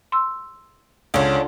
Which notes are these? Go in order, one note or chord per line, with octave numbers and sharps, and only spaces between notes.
C6 E6
C#2 D3 C#4 D4 F4